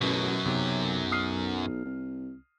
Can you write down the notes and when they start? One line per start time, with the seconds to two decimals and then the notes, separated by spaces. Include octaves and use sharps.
0.01 A1 F#2 B2 F#3
0.46 B1 C3
1.12 D#6 F6 C7
1.85 C2